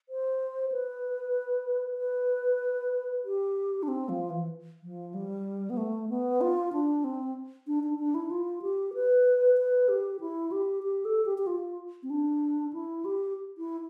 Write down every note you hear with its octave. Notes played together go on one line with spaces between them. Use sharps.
C5
B4
B4
G4
D4
C4
F3
E3
F3
G3
B3
A3
B3
F4
D4
C4
D4
D4
D4
E4
F4
G4
B4
B4
G4
E4
G4
G4
A4
G4
G4
F4
C4
D4
E4
G4
E4